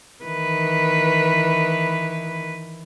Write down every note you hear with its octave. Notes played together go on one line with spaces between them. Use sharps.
D#3 E3 B4